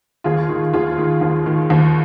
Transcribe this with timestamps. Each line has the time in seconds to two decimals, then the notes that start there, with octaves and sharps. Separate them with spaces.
0.24 D#2 F4 G#4
0.49 D#3
0.73 D#2 F4 G#4
0.98 D#3
1.21 D#2
1.46 D#3
1.70 D#2